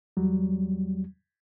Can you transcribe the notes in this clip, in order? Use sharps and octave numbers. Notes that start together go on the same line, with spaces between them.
E2 F#3 G3